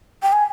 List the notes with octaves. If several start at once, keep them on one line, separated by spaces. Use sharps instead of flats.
G5
G#5